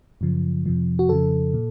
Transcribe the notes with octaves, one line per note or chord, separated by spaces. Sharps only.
F#2 C#3 F3
F2 C3 F3
F#4
F2 C#3 F3 A4
A#2